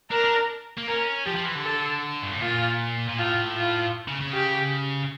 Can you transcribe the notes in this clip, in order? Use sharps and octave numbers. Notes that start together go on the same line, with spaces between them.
D4 A#4
D4
A#3
C#4 A#4
F3 G4
F3
E3
D3
A4
G2
A2
A#2 F4
A#2
A2 F4
F4
C#3
C#3
G4